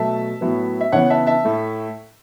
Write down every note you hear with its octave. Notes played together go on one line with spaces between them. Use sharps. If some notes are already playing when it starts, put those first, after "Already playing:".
Already playing: B2 F#3 A3 E5 A5
A2 F#3 B3
E5
C#3 E3 B3 C#5 F#5
E5 A5
E5 A5
A2 A3